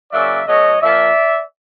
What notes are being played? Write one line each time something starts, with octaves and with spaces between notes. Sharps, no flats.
C#3 F#3 A#3 D5 E5
B2 F#3 A3 C#5 D#5
A#2 F3 A#3 D5 E5